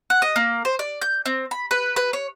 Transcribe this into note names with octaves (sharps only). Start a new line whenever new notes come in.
F#5
D#5
A#3
C5
D5
G6
C4
B5
B4
B4
C#5